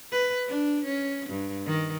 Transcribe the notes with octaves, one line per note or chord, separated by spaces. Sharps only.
B4
D4
C#4
G2
D#3